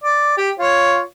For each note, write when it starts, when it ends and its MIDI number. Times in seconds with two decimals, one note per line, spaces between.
0.04 0.33 74
0.37 0.50 67
0.59 1.00 65
0.59 1.00 73